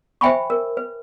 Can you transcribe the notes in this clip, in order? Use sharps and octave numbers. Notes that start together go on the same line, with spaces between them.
C5 E5 G5 G#5 B5 C#6
A#4
B4